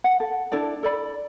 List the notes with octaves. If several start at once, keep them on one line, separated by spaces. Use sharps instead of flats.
F#5
A4
D4 E4 A4 D5
A4 D5 B5